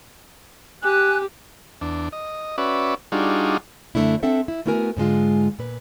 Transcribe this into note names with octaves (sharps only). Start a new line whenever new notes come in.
G4 G#5 F#6
E2 D4
D#5
C#4 F#4 B4 D5 E5
G3 D4 D#4 F4 F#4 G#4
F#2 D3 A3 D4 E4
C4 D4 A4 E5 F#5
E4
A3 B3 E4 F#4 A#4 G#5
G#2 D3 G#3 F4
A#2 B4